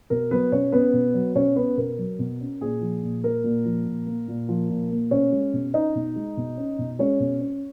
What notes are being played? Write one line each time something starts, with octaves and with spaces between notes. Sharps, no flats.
B2 A#4
F#3 B3 B4
B2 C#4 C#5
B3 C#4 B4
B2
F#3
B2 C#4 C#5
B3 C#4 B4
B2 A#4
F#3
B2
C#4
A#2 G#4
F3
A#2
A#3 A#4
A#2
F3
A#2
A#3
A#2
F3
A#2
A#3
B2 C#4 C#5
G#3
B2
C#4 D#4 D#5
B2
G#3
B2
C#4
B2
G#3 C#4 C#5
B2
C#4